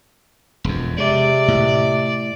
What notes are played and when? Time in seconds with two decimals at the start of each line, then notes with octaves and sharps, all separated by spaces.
0.64 E1 F2
0.98 C3 G#3 D5
1.48 A2